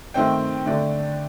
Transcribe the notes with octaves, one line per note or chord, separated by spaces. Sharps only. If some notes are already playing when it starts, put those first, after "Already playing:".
D#3 A3 C4 G5
D3 A3 D4